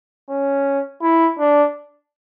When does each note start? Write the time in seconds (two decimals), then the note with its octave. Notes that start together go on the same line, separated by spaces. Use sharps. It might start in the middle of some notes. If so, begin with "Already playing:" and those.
0.29 C#4
1.02 E4
1.39 D4